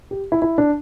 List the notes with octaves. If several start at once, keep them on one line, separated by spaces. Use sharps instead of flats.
G4
E4
E4
D4